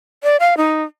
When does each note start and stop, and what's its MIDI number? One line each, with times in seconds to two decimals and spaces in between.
0.24 0.37 74
0.40 0.57 77
0.57 0.84 63